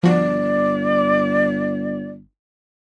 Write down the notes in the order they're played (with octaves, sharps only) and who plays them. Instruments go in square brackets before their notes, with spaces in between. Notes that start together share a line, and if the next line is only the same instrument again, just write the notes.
[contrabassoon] G1 [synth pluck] F3 F#4 [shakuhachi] D5